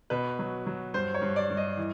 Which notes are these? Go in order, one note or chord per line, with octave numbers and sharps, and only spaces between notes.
B2 B4
F#3
F#3
G2 C5
C#5
G2
D5
G2
D#5
E3